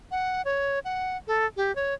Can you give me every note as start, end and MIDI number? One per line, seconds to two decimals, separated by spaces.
0.11 0.42 78
0.45 0.79 73
0.85 1.17 78
1.27 1.46 69
1.57 1.74 67
1.76 1.94 73